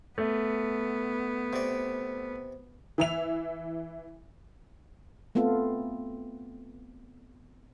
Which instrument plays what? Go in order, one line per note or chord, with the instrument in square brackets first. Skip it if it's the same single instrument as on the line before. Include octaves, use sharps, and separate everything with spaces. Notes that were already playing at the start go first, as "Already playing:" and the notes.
[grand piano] A3 [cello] B3
[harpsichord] C3 D5
[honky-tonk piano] E3 E5 F7
[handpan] A3 B3 C4 F4 A4